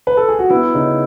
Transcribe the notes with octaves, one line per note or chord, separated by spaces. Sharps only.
B4
A4
G#4
F#4
B3 E4
C#3 D#4